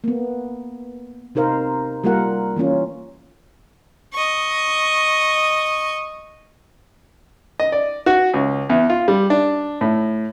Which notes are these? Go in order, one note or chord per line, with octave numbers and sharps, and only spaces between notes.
A#3 B3
C3 D#4 A#4 C5 F5
G3 A#3 F4 A#4 F#5
E3 A#3 C#4 F4
D#5 C#6
D#5
D5
F#4
C#2
E2
F4
G3
D4
A2